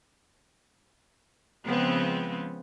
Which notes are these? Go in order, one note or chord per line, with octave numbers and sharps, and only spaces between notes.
C#3 F3 G#3 B3 C4